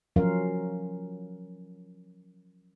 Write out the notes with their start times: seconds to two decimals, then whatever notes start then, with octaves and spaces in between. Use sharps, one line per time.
0.16 F3 F#3 C#4 F4 A#4 F5